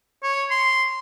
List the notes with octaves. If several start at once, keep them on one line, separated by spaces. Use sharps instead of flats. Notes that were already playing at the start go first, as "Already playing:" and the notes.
C#5
C6